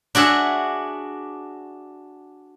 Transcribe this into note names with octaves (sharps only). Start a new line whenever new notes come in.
D4 F#4 G#4 E5